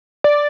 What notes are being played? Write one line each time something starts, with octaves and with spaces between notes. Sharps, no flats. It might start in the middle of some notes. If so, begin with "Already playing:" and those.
D5